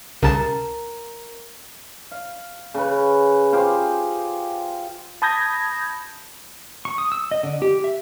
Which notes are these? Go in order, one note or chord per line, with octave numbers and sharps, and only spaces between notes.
C2 C#3 A#4 A5 A#5
F5
C#3 C#4 B4
F4 G4 G#4 C5
A5 B5 D#6 G6 G#6 A#6
C#6
D#6
E6
D#5
D3
G4
E5